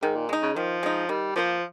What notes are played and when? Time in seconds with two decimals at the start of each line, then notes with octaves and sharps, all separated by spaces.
0.02 G#2 D#3
0.16 A#2
0.29 G#3 D#4
0.42 C#3
0.56 D#3 F3
0.83 G#3 D#4
1.09 D#3 G3
1.36 F3 A#3 F4 C5